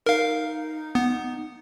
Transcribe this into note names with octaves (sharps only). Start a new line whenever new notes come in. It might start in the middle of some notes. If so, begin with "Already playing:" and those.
D#4 A#4 F5
B3